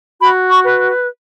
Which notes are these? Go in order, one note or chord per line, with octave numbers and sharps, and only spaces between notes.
F#4 B5
C#6
B4